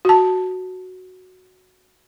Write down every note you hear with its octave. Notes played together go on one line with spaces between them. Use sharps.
F#4 A5